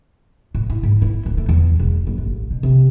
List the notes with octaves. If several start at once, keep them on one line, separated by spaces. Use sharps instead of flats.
A2
E4
G#2
E4
D1
A3
E2
E1
F#1
A1
B2
C3